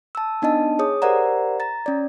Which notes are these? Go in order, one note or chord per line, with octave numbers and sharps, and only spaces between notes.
A5 E6
B3 D4 D#4 D#5 A5
G#4 C#5 D#6
G4 A#4 C5 D5 F#5 A#5
A#5 A6
C#4 D5